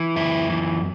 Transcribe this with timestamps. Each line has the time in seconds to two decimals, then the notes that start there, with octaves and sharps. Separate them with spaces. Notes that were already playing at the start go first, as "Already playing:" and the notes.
Already playing: E3
0.16 F#2 E4
0.50 E3